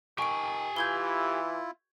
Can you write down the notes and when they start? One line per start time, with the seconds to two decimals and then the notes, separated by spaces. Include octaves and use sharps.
0.18 D#3 G4 G5 G#5 C#6 D7
0.76 E3 E4 F4 G6 G#6 G7